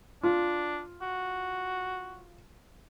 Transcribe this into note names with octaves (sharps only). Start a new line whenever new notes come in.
D4 F4
F#4